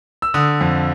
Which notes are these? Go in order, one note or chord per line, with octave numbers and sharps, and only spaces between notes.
E6
D3 D#6
F2